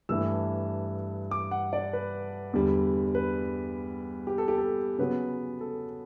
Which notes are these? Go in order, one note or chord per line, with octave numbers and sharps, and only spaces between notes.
G2 E3 A3 E6
D6
F#5
D5
B4
E2 D3 G3
B4
G4
A4
G4
A4
C#3 F#3 B3 B4
A4